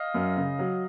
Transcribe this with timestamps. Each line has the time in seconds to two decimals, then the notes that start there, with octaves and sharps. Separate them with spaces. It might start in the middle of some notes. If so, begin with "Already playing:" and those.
Already playing: D#5 F5
0.14 F#2
0.37 C#3
0.59 F#3